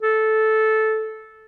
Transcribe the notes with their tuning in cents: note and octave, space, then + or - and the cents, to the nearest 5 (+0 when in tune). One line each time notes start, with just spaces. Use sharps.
A4 -10